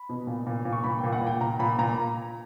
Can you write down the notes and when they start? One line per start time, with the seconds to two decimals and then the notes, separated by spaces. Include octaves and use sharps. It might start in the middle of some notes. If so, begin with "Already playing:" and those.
Already playing: B5
0.09 B2
0.27 A#2
0.47 A#2
0.65 A#2
0.73 C#6
0.84 A#2 B5
0.99 A#2 G5
1.12 F#5
1.21 A#2
1.27 G5
1.41 A#2 A#5
1.59 A#2 B5
1.78 A#2 A#5